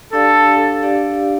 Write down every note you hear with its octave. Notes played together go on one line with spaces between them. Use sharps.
D4 G4 A4 D5 F5
D4 G4 D5 F5